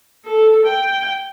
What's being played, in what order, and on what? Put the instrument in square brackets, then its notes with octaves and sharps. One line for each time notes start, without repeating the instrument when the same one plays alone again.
[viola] A4
G5